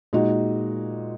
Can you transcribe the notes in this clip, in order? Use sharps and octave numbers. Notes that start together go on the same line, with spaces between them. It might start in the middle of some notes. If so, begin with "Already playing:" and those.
A#2 G#3 D#4 F#4